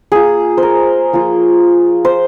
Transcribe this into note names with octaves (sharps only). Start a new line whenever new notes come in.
A#3 F4 G#4
C5
A#4
F3 A#3 F4
C5